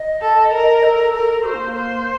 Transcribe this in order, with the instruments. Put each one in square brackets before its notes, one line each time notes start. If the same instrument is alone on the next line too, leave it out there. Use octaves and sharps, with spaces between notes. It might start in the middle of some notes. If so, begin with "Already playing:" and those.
Already playing: [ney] D#5
[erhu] A4
A#4
[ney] A4
[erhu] A#4
[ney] F#4 [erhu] C5
[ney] A#3
A#3
[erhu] C5